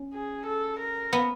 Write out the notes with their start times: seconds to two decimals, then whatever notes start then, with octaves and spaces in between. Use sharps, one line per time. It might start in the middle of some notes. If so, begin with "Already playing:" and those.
Already playing: C#4
0.13 G#4
0.46 A4
0.79 A#4
1.13 B3